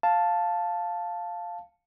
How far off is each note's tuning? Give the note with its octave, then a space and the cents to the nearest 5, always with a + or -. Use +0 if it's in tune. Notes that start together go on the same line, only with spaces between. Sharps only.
F5 +0 A5 +0